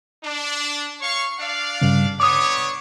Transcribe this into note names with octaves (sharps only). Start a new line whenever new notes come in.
D4
C#5 F5 C#6
D4 D5 F5
G2 C#3
B3 D4 C#5 D6 D#6